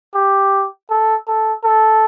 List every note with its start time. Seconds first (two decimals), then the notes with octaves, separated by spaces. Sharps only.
0.15 G4
0.90 A4
1.28 A4
1.64 A4